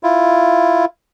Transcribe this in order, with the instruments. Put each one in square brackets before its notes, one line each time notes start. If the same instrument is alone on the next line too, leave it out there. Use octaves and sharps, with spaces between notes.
[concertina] E4 F4